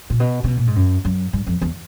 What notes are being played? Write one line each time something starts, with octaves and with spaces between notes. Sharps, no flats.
A#2
B2
C3
B2
A#2
G#2
F#2
F#2
G2
F2
E2